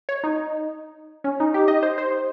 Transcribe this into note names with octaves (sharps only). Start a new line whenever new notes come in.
C#5
D#4
C#4
D#4
G4
D#5
C5
C5